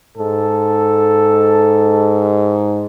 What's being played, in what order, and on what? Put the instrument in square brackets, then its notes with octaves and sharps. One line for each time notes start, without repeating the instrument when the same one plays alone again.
[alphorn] G#2 [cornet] A4